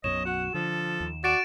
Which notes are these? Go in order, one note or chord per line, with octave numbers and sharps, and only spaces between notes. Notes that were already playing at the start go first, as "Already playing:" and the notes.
B1 F#2 B2 C#5 D#5 E7
F#4 F#5
D3 F3 A4
D#2
F#4 D5 A6 D7 E7